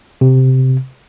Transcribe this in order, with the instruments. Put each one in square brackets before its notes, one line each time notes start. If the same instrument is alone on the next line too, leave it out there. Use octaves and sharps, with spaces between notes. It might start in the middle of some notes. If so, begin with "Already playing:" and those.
[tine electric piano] C3